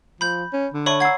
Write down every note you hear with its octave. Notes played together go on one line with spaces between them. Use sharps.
F3 B5 G6
C#4
D3
C#5 D5 E5 A5 B5 C#6
F#5 A#5 E6 G#6 C7